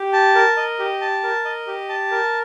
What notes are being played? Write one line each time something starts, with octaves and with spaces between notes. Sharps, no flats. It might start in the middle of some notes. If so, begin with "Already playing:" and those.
Already playing: G4
A5
A#4
D#5
G4
A5
A#4
D#5
G4
A5
A#4